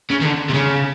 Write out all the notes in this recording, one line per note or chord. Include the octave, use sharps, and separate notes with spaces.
C#3
D#3
D3
C3
C#3